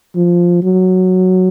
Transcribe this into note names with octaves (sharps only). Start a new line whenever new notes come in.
F3
F#3